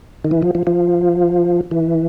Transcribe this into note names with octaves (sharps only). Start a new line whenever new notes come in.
D#3
E3
F3
F3
F3
E3